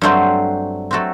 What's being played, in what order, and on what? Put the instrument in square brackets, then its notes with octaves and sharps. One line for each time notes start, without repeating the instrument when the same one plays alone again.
[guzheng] G2 F#3 A3 C4 A4 C5
F#3 A3 C4 F#4 A4